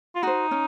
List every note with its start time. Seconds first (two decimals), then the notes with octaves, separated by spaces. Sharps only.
0.15 F4
0.23 D#4 F#4 C5
0.51 C#4